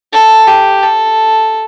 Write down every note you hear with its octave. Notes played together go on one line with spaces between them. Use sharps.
A4
G4
A4